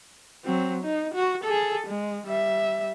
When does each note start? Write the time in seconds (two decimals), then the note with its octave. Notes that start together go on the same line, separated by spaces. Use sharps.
0.45 F#3 C4
0.84 D#4
1.14 F#4
1.44 G#4 A4
1.87 G#3
2.27 G3 E5